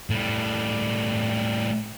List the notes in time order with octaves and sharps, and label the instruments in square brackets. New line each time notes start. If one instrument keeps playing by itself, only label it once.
[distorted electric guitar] A2 G3